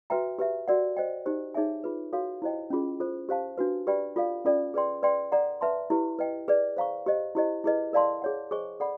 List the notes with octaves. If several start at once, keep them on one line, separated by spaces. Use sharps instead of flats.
F#4 B4 E5 G5 A#5
G4 B4 E5
F#4 A#4 D5 F#5
C5 D#5 G5
D#4 G4 C5
D#4 G#4 C#5 E5 G#5
F4 G#4 B4
F#4 A4 C#5 F5
E4 G4 C5 D#5 G5
C#4 F4 G#4
F4 A4 C5
G4 C5 F5 A5
D4 F#4 B4
G4 B4 D5 G5 B5
F4 A4 D5 F5
C#4 F4 A4 D5 G5
G#4 B4 D5 G5 C6
B4 D5 G5 C6
A4 D5 F#5 A#5
B4 E5 A5 C6
E4 G4 B4
B4 D#5 G5
G#4 B4 D5
C5 F5 A#5 C#6
G4 C5 D#5
E4 G4 C5 D#5
E4 G#4 B4 D#5
A#4 D5 F5 A5 C6
G#4 C#5 F#5
G#4 C5 D#5 G#5 C#6
A4 D5 F#5 B5